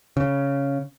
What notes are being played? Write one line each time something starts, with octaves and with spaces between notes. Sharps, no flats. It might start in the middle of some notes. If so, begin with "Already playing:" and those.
C#3